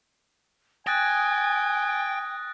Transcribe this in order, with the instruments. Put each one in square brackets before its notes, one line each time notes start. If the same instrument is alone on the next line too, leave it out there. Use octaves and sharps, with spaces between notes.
[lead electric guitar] G5 [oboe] G#5 [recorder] D#6 [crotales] F#6 A6 A#6